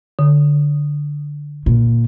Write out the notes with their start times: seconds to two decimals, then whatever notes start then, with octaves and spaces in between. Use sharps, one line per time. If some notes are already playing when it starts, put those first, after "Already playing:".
0.19 D3
1.66 A#2